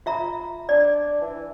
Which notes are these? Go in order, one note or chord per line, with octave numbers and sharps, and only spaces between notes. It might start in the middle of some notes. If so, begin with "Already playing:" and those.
F4 E5 A#5
D4 D5
E3